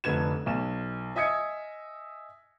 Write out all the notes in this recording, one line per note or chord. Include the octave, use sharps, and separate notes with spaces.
F1 F2 D3 B4 G#6 E7
B1 E7
D#5 E5 G#5 D#6 G#6 C#7